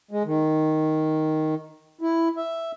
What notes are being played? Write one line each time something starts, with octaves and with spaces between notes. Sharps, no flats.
G#3
D#3
E4
E5